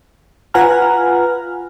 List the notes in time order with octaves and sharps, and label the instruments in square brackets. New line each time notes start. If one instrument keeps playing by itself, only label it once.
[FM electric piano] F4 B4 F#5 G#5 A#5 F6